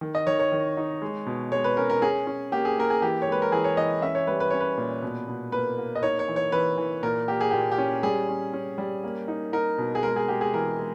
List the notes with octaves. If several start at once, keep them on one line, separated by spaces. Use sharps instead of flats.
D#3
D#5
D#3 C#5
C#5
D#3
D#4
G#3
B2
G#3 C#5
B4
C#4 A#4
A#4
C#4 G#4
C#4
A#3 G4
G#4
A#3 A#4
G#4
E3 G4
C#5
G#3 B4
A#4
E3 G#4
C#5
E3 D#5
C#4 E5
C#5
G3 B4
B4
C#4 C#5
B4
A#2
B2
B2
A#3 B4
A#3
D#5
D#4 C#5
C#5
E3
C#5
E3 B4
E3
A#2 A#4
A#3 G4
G#4
A#2 G4
G4
C#4
G3 G#4
C#4
C#4
G3
A#3
D#4
D#4 A#4
B2
G#4
G#3 A#4
G#4
G#3 G4
G#4
E3 A#4
G#3